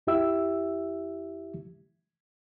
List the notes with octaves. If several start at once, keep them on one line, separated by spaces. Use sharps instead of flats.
F2 E4 G4 E5 E6